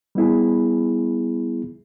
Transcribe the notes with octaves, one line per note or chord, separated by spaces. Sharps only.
G3 B3 E4 G#4